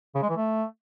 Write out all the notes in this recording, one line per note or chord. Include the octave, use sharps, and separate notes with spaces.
C#3
G#3
E3
A3